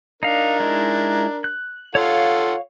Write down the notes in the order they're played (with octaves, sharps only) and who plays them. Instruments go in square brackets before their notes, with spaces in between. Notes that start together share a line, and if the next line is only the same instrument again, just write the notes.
[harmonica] D4 A#4 [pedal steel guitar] D#4 F5
[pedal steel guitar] G#3 D#4 E4
F#6
[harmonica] F4 A4 F#5 [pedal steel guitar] C#5 F5